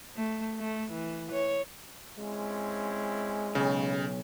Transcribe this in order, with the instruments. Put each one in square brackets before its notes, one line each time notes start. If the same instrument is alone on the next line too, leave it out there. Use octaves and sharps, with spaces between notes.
[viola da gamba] A3
A3
E3
C#5
[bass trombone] G#3 [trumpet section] C4 C#4 E4
[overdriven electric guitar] B1 [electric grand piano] C#3